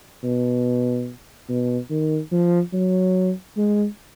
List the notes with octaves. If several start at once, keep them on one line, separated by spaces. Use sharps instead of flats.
B2
B2
D#3
F3
F#3
G#3